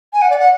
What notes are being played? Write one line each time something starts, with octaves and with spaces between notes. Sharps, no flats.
G#5
F#5
D5
F#5